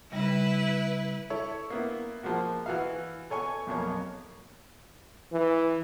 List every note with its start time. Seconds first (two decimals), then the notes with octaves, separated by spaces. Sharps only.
0.12 C#3 G3 E4 B4
1.30 E4 A4 C#5
1.70 A#3 B3 E4
2.23 F3 G#3 A#3 F#4
2.66 E3 F#4 F5
3.30 A4 C#5 G#5 C#6
3.67 B1 F2 A#3 C#5
5.33 E3